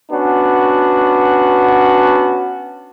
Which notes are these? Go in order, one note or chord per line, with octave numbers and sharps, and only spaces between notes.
B3 C#4 D4 F#4